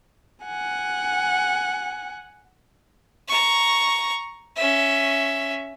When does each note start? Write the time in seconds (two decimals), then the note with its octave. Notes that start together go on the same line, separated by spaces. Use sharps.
0.45 F#5 G#5
3.28 A#5 C#6
4.57 C#4 E5